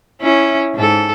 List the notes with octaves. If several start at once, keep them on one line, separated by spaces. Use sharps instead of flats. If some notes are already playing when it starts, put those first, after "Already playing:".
C#4 E4
G#2 A4